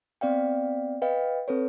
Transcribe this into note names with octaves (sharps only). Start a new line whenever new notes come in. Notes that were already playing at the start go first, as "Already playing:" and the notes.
B3 C4 D5 F5 G5
B4 D#5 F5 G5
C4 A4 B4 C#5